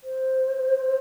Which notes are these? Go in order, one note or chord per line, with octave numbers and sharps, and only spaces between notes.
C5